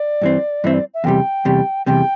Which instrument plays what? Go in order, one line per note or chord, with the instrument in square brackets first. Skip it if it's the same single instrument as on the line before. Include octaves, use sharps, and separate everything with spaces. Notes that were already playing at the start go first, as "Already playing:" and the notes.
Already playing: [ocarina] D5
[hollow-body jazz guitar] G2 E3 C4
[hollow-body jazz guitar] G2 E3 C4 [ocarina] E5
[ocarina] D5
E5
[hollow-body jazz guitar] E2 C3 G3 [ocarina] G5
[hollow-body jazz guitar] E2 C3 G3
[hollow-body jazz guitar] E2 C3 G3 [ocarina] G5